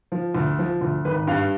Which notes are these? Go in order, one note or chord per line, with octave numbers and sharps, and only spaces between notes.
F3
D2
F3
D2
G#1 B4
G2 F5